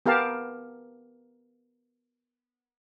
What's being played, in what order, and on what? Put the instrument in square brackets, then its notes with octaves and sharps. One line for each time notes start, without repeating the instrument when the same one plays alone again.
[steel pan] B3 G4 A#4 F5 A5